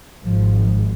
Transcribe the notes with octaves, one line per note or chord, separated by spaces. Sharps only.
G#1 G#2 F3